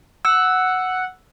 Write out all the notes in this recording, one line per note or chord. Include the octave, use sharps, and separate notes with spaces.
F#5 E6